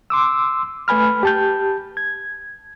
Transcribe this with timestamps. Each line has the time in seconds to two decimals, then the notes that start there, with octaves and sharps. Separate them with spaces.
0.10 C6 D6 E6
0.88 A3 B4 G#5 B5 F6
1.23 G4 A5 G6
1.97 G#6